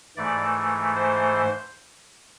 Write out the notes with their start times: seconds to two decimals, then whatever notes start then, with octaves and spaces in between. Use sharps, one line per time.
0.17 G#2 E3 A3 D5
0.95 C5